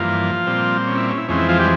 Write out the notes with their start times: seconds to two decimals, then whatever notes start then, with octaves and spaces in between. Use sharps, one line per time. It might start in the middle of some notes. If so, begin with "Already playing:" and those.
Already playing: G2 E3 F3 A#3 F4
0.47 A#2 G3 C4
0.87 C#4
0.97 E4
1.09 C#4
1.18 E4
1.28 F2 E3 G#3 C4 C#4
1.38 E4
1.49 F3 F4
1.59 G3 G4